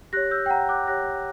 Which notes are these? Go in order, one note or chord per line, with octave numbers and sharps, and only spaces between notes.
G4 C#5 F#6 A#6
E6 G6
G5
F#5 A#5
D6 F#6
G4 C#5 F#6 A#6